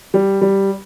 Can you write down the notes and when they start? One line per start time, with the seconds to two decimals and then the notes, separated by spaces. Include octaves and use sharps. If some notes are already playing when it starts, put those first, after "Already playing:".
0.14 G3
0.41 G3